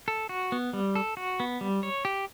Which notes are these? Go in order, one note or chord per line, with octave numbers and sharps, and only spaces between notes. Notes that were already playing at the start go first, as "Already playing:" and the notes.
A4
F#4
B3
G3
A4
F#4
B3
G3
C#5
G4